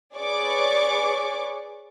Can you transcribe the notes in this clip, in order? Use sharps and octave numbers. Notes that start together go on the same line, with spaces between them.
G#4 B4 C#5 D5 C#6 D6